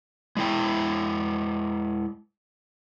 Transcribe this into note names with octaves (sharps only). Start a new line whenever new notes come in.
G#3 E4 G5